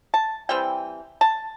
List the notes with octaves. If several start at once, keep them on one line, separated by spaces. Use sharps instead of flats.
A5
E3 G3 C4 G5
A5